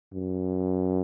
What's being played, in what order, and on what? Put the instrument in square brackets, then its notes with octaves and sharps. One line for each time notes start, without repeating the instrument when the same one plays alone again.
[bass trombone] F#2